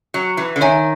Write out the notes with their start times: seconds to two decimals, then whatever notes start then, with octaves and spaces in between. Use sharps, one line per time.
0.14 F#3
0.37 E3
0.56 D3
0.61 D#3 C#5 E5 G#5